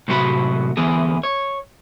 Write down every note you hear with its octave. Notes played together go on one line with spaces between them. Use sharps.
A2 C3 F#3 F#4 F5 B5
D2 E3 B3 G#4
C#5